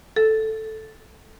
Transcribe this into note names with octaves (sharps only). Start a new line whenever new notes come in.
A4